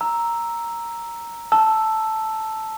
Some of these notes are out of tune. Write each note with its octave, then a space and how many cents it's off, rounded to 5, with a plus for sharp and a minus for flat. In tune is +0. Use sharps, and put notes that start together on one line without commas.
A#5 +0 E6 +0
A5 +0 E6 +5